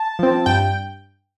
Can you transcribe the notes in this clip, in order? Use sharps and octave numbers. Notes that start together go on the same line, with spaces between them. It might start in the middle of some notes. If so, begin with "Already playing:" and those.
Already playing: A5
F3 C4
G2 G5